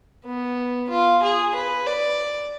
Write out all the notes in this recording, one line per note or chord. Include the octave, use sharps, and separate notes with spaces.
B3
F4
G#4
B4
D5